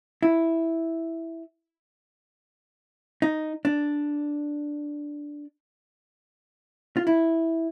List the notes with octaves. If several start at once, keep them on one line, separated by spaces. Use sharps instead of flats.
E4
D#4
D4
F4
E4